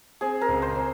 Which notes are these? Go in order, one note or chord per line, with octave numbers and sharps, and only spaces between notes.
C4 G#4
A#4
C#2
C5
C4